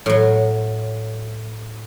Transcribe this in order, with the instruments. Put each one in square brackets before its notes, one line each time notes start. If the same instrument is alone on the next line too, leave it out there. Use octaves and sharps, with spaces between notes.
[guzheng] A2 F#3